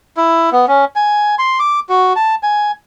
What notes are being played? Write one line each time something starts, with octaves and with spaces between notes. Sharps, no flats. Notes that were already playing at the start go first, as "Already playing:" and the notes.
E4
B3
C#4
G#5
C6
D6
F#4
A5
G#5